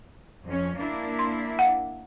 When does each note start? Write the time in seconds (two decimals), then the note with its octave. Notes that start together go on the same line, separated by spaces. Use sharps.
0.45 F2 C#4
0.75 A#3 D4 E4
1.19 C6
1.59 F5 F#5